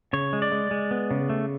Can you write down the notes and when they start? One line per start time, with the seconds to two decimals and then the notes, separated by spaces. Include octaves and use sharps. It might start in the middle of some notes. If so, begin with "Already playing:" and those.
0.13 C#3 C#5
0.33 G#3
0.42 D5
0.52 G#3
0.71 G#3
0.91 B3
1.11 C#3
1.29 A3